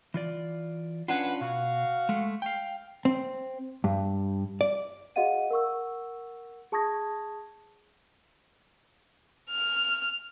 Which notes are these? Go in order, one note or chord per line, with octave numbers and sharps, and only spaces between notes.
E3 F4 D5
C#4 D4 F4 B4 F#5
B2 F#4 F5
G#3 A3
F5 G5
C4
G2
D5
F#4 G#4 D#5 F5 F#5 D#7
A#4 F#5 C#6 E6
G#4 A5 C#6 D#6 G#6 A#6
F6